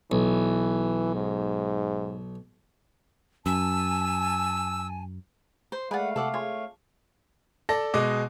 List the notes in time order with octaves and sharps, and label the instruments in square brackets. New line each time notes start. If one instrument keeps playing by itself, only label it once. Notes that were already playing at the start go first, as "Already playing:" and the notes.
[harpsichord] B1 [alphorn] E3
[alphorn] G#2
[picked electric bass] F#2 [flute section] G#5 A5 [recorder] E6
[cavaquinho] C5
[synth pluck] G#3 G#4 D5 [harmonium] A3 F5 [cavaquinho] B4 F#5
[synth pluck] C3 [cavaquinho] A4 D5 F#5
[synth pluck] F4 G#4 [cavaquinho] C#5
[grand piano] A4 D5 A5 A#6
B2 G#3 D#5 D6